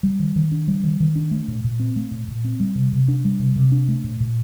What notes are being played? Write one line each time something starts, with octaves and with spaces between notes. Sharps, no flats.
G3
D#3
D#3
D4
G3
D#3
D#3
D4
A3
A#2
A#2
C4
A3
A#2
A#2
C4
G3
C3
C3
D4
G3
C3
C3
D4
A3
A#2
A#2